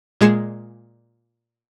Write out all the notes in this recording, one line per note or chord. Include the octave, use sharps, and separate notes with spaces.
A#2 G#3 G#4 C7 C#7 E7